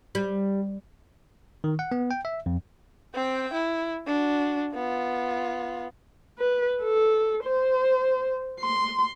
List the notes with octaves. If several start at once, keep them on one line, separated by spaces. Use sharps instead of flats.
G3
D#3
F#5
B3
G5
E5
F2
C4 G5
E4
D4 F#4
B3 F4
B4
A4
C5
C6